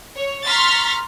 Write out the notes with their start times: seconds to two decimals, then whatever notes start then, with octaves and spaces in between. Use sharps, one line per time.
0.16 C#5
0.46 A#5 C6 C#6 F6 A6 B6